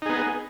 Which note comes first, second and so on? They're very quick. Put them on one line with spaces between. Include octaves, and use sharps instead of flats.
D#4 G#4 B3